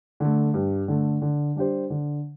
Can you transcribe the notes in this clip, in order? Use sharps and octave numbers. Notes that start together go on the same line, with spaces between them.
D3 A3
G2
D3 A3
D3
G3 D4 G4 C5
D3